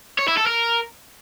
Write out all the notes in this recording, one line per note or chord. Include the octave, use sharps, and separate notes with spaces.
C#5
E4
A4
A#4